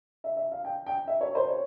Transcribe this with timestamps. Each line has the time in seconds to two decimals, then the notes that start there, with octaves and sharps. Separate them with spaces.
0.24 E5
0.37 E5
0.52 F5
0.65 G5
0.86 G5
1.08 E5
1.21 C#5
1.35 C5
1.48 C#5